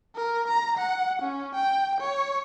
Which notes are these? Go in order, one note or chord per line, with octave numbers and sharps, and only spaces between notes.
A#4
A#5
F#5
C#4
G5
C#5